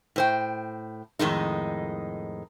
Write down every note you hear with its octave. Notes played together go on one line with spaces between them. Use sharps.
A2 C5 G5
F2 A2 D#3 G#3 D#4